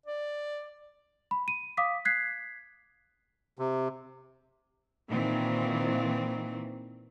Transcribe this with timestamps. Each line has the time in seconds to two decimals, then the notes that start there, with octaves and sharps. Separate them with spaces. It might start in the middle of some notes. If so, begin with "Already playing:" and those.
0.06 D5
1.31 B5
1.48 D#7
1.77 F5 D6 D#6 B6
2.05 F#6 G#6 B6 C7
3.59 C3
5.09 A#2 D#3 E3 C4